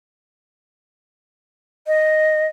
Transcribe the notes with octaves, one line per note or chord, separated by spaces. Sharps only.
D#5